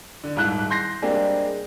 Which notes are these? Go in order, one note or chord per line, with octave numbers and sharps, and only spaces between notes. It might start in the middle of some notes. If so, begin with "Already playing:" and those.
D3
D#1 G#2 E4 F#6
C6 G6 A#6 C7
G3 G#3 A#3 C4 D4 G#4